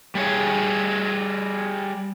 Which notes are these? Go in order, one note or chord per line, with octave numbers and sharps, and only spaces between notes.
G3 G#4 C#5